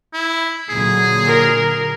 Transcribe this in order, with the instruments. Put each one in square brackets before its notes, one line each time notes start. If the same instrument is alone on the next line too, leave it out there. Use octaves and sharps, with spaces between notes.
[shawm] E4
[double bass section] A#2 D3 F#3 [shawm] G#4
[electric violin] A#4